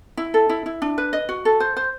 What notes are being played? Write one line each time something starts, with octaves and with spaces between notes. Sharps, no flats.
E4
A4
E4
E4
D4
B4
D#5
F#4
A4
C5
C5